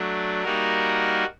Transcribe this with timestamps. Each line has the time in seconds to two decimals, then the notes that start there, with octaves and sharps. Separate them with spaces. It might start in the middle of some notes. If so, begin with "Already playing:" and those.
Already playing: F#3 A3 D4
0.43 G3 A#3 D#4 F#4 A#4